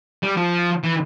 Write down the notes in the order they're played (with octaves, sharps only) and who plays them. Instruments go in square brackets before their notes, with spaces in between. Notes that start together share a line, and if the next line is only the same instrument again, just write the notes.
[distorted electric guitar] G3
F3
E3